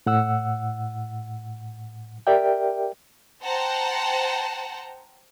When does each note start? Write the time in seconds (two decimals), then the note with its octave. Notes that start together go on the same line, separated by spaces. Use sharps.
0.06 A2 F#5 E6
2.27 G4 A#4 D5 E5 G5
3.44 C5 F#5 G5 A5 A#5